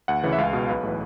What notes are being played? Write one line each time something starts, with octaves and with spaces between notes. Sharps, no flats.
D2 F#5
C#3 E3
E5
C#2 F5
B2
B1 B4
A2 E3